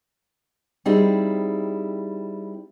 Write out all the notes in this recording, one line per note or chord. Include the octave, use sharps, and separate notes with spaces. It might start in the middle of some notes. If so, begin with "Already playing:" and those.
G3 C4 D#4 E4 G#4 F5